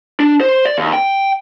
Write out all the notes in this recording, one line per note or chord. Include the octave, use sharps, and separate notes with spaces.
D4
C5
D5
D#2
G5